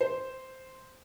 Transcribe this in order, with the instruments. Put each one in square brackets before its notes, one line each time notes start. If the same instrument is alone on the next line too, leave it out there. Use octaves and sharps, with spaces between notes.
[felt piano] C5